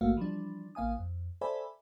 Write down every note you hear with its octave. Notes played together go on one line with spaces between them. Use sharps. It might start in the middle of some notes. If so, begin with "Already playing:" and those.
A1 G#2 A3 A#3 F#4 F5
E3 F3 G3 D4
A1 A#3 F5 G#5 D#6
F2
A4 C5 D5 E5 G#5 B5